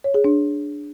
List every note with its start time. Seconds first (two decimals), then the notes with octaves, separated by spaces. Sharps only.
0.04 C#5
0.14 G#4
0.24 D4